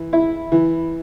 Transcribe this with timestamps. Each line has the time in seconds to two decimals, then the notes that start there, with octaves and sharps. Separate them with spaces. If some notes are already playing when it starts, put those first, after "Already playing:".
Already playing: E3
0.13 E4
0.52 E3